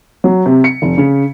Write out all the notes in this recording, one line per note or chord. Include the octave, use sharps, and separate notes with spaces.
F#3
C3
C#7
F1
C#3